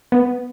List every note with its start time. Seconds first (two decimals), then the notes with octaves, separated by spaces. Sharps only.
0.12 B3